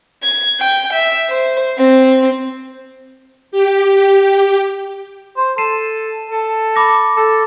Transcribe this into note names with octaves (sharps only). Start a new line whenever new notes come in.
G#6
G5
E5
C5
C4
G4
C5
A4 C7 D#7 E7
A4
B5 D6 A#6
A4